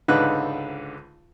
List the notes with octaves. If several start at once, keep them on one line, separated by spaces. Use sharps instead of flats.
C#2 G#2 D3 D#4 B4 F#6